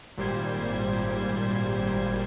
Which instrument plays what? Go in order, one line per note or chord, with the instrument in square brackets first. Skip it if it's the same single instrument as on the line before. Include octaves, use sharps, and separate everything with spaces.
[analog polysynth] G#1 A#2 G3 C5 G#6